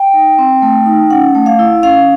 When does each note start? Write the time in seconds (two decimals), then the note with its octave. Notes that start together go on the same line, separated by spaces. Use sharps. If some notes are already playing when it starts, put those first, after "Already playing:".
Already playing: G5
0.14 D#4
0.38 C4
0.62 A3
0.86 D#4
1.10 C#4 F#5
1.35 A3
1.46 F5
1.59 E4
1.83 C#4 F5